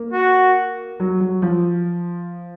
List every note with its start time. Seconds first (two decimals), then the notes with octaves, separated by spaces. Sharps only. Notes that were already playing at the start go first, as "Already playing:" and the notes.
Already playing: A#3
0.13 F#4
1.00 F#3
1.21 F#3
1.42 F3